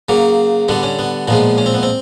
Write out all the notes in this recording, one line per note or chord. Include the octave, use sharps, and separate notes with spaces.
C#3 F#3 A#3
D3 G3 B3
C#4
B3
A#2 F3 G#3 B3
C#4
C4
B3
C4